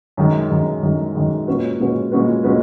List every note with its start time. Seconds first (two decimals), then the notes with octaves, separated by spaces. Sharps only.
0.17 F#2 D#3 G#3
0.50 F#2 D#3 G#3
0.83 F#2 D#3 G#3
1.15 F#2 D#3 G#3
1.47 A#2 G#3 C#4 F#4 B4
1.80 A#2 G#3 C#4 F#4 B4
2.12 A#2 G#3 C#4 F#4 B4
2.44 A#2 G#3 C#4 F#4 B4